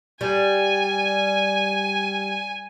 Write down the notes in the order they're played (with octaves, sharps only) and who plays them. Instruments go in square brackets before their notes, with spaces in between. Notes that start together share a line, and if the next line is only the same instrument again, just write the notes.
[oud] G3 [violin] G#5